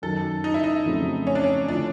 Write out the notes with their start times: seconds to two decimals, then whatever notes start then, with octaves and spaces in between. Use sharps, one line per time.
0.02 F#2 D#3 F#3 A4
0.44 D#4
0.54 E4
0.64 D#4
0.86 F2 C#3 F#3 A3 C4
1.27 C#4
1.35 D4
1.44 C#4
1.68 D3 F3 A3 C#4 D4 E4